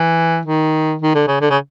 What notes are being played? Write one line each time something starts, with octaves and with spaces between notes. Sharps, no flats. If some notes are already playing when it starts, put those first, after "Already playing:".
Already playing: E3
D#3
D#3
D3
C#3
D3
C#3